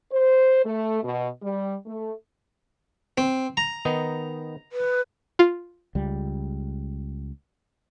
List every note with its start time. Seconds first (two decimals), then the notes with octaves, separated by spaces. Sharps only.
0.12 C5
0.65 A3
1.03 B2
1.42 G3
1.86 A3
3.18 C4
3.57 A#5
3.85 D#3 B3 D#4
4.72 B4
5.39 F4
5.95 C#2 G3